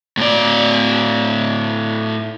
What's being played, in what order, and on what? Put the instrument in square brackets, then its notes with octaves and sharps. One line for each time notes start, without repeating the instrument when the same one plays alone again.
[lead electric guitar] A2 D5